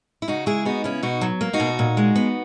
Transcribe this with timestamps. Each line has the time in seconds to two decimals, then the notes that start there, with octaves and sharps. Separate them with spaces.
0.22 E4
0.28 C#3 D#4 F#4
0.46 G#3 E4 G#4
0.65 B3 D#4 F#4
0.84 C#3 C#4 E4
1.03 B2 D#4 F#4
1.21 F#3
1.41 A#3
1.53 D#4 F#4
1.60 B2
1.79 A#2
1.97 G#3
2.16 B3